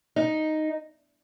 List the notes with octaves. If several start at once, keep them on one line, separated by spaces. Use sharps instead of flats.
D#4